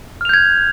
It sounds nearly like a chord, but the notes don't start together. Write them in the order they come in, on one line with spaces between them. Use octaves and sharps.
F6 F7 G6 G#6